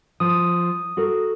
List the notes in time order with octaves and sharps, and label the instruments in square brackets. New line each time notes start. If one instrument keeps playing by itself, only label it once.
[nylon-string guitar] F3 [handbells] D#6
[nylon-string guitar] F#4 A4 A#4